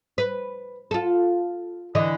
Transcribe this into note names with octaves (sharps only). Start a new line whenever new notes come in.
B4
F4 A4
D3 E3 D#5